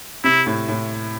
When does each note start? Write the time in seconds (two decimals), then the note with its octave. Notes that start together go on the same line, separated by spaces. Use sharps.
0.24 C3 E4
0.46 A2
0.68 A2